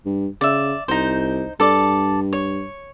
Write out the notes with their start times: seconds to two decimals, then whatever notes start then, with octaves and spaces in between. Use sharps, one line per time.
0.06 G2
0.41 C#3 D5 E5
0.88 C2 D#4 C5
1.60 G2 A4 D5
2.33 C#5